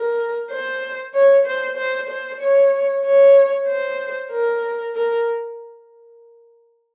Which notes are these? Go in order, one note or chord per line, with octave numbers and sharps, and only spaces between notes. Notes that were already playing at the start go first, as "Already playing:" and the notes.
Already playing: A#4
C5
C#5
C5
C5
C5
C#5
C#5
C5
A#4
A#4